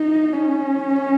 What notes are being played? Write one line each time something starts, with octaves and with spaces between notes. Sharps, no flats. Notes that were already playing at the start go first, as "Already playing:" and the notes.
Already playing: D#4
C#4